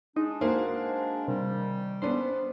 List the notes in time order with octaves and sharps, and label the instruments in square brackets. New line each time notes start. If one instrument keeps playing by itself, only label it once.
[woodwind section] G#3 D4 [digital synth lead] D#4
[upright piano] A#3 F#4 [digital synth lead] C5
[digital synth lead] C3 [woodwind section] D#3 G3
[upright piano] B3 C#4 D4 [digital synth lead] C5